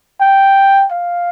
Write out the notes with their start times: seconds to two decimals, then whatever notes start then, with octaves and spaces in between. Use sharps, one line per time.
0.21 G5
0.91 F5